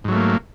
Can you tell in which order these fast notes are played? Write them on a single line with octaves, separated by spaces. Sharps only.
G#2 F#3 A3 A#3